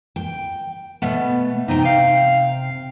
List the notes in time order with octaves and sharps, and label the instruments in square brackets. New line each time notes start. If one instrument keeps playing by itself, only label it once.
[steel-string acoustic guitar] G5
B2 A3 B3
[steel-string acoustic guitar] C3 G5 [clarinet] D#4
[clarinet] F5